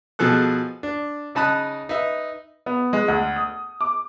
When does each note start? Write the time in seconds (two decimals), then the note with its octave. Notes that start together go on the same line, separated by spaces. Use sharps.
0.19 B2 F3 G#4 A4 F#6
0.83 D4
1.35 C#3 D#4 A5 B5 D#6 F#6
1.89 D#4 B4 E5
2.66 B3
2.93 G#3
3.08 D2
3.36 D#6
3.81 D6